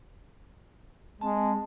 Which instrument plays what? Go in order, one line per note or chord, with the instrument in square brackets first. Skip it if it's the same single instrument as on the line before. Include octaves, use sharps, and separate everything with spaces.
[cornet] G#3 [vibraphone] C4 A5